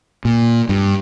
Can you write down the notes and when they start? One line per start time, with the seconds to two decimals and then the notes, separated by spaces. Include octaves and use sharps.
0.25 A#2
0.69 G2